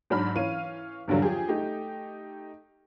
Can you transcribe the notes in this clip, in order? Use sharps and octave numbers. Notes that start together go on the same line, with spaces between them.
G#2 F#3 D4 B5 F6
E3 C#4 C#5 F5 D#7
E2 G2 D3 F#3 G3
F3 G4 G#4
A3 D#4 G4